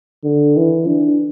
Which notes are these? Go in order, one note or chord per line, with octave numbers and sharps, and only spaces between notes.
D3
E3
D4